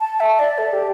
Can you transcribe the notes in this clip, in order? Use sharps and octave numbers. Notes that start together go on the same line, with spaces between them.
A5
E5
D5
A4
G4